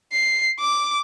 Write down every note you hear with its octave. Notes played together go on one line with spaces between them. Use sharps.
C7
D6